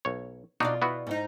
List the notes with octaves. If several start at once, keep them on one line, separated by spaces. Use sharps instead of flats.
B1 C#5
B2 D4 D#4 F4 F#4 D5
B3 E4 F#4
G#2 D#4